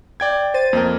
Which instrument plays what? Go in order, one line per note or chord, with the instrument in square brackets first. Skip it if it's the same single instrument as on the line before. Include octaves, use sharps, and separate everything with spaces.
[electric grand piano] D5 G5 G#6
[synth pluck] C5 A6 D#7
[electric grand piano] F2 A#4 [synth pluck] A#3 D#5